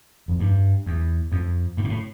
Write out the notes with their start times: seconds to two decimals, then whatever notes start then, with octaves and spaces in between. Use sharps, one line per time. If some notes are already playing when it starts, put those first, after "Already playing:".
0.28 F2
0.40 G2
0.86 E2
1.32 F2
1.77 G2
1.84 A#2
1.90 A2